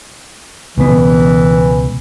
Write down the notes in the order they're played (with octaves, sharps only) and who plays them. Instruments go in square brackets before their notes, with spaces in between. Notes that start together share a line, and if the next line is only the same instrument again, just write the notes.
[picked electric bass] C#2 B2 B3 [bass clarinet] E3